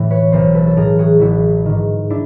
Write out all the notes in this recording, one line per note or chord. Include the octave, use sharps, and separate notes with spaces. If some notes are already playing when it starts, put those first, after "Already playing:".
Already playing: A2 E3
B4 C#5
B1 A#4 C5
A4 B4
A4
A2 E3 G#4 A#4
F#4 G#4
A1 E4 F#4
G#2 D#3
D4 E4